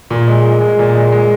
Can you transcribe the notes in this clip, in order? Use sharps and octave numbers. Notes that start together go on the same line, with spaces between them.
A#2
G#3
G#3
G#3
A#2
G#3
G#3